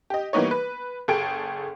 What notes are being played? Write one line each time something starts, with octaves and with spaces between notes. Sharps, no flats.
G4 D#5
E3 G3 A#3 B3 D#4 C#5
B4
F#1 G#4 A4 G5 D7